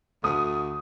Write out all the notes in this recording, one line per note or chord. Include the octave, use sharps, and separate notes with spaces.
D2 D#6